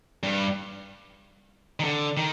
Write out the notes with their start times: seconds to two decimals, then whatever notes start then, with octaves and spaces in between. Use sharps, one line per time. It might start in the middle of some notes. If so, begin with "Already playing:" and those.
0.23 G2
1.80 D#3
1.84 D3
2.17 D#3